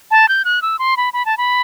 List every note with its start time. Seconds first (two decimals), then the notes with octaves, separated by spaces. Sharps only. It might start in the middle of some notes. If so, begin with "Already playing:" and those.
0.11 A5
0.29 G6
0.45 F#6
0.62 E6
0.79 C6
0.97 B5
1.13 B5
1.26 A5
1.38 B5